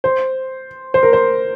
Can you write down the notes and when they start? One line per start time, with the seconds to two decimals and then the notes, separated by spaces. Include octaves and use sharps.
0.04 C5
0.94 C5
1.03 A#4
1.13 C5